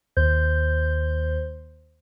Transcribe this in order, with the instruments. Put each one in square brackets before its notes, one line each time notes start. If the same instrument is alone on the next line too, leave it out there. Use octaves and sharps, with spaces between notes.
[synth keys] D#2 C5 G6